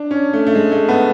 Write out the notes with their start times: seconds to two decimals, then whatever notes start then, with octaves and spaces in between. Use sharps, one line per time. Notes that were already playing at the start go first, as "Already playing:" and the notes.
Already playing: D4
0.11 C#4
0.33 A3
0.47 A3
0.55 G#3
0.72 A3
0.89 B3